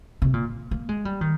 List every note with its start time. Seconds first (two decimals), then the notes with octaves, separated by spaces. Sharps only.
0.22 C3
0.34 A#2
0.71 A#3
0.89 G#3
1.05 G3
1.21 D#3